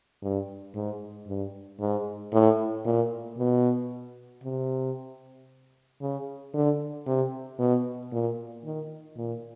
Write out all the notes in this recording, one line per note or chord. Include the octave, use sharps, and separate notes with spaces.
G2
G#2
G2
G#2
A2
A#2
B2
C3
C#3
D3
C3
B2
A#2
D#3
A#2